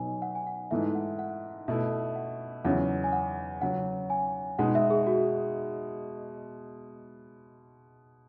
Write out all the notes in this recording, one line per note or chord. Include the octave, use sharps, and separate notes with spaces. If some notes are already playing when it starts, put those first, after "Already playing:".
Already playing: B2 F#3 B3 D#4 G#5
F#5
G#5
F#5
G#2 E3 A3 E5
F#5
F#5
B2 A3 E4 E5
F#5
E2 C#3 F#3 C#4 E4 F#5
G#5
F#5
C#3 F#3 C#4 F#5
G#5
B2 G#3 D#4 F#5
E5
G#4
F#4